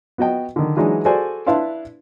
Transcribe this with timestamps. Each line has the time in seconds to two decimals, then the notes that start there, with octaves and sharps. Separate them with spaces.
0.18 B3 F#4 D#5 G5
0.56 D3 D#3
0.77 E3 F#3 G#3 D4 D#4
1.05 F#4 G#4 A4 C5 D5 G#5
1.47 D4 E4 B4 F5 A5 C6